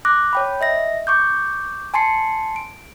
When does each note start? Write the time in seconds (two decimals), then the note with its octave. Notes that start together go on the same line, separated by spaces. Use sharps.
0.05 D6 F#6 A#6
0.33 C#5 G5 B5
0.61 D#5 E5 A#6
1.07 C#6 D6 G6
1.94 G#5 A5 C6 C7 C#7
2.56 D7